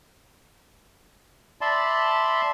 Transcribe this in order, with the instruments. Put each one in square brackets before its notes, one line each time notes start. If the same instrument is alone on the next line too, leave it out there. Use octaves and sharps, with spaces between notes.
[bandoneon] D5 E5 A5 B5 C6